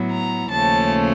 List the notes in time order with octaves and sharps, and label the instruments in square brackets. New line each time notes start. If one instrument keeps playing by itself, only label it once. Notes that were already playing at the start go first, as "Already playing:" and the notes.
Already playing: [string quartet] A2 F#3 B3 E4
A#5
D#2 C#3 F3 A3 C#4 A5